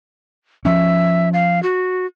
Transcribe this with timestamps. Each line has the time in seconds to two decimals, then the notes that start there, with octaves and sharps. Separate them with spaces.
0.65 F3 C#4 E5
1.33 F5
1.63 F#4